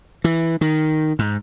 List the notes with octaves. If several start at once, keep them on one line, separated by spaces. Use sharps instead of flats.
E3
D#3
G#2